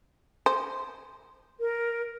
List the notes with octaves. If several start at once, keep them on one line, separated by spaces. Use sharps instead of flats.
C5
A#4